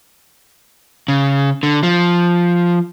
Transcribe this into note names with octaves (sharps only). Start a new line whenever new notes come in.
C#3
D3
F3